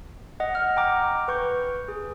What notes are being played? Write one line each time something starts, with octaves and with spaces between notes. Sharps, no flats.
D#5 F#5
D#5 F#5 F6
G5 A#5 D6 F6
B4 C#6 G6
G#4